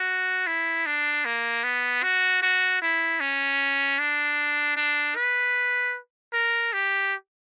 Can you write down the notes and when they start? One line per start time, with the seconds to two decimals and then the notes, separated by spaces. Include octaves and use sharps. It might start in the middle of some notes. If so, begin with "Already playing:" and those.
Already playing: F#4
0.47 E4
0.86 D4
1.25 A#3
1.64 B3
2.03 F#4
2.42 F#4
2.82 E4
3.20 C#4
3.99 D4
4.76 D4
5.16 B4
6.33 A#4
6.73 G4